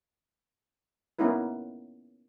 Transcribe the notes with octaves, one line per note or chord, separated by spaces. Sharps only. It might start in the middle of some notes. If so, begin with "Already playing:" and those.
A#3 B3 C#4 D#4 E4 B4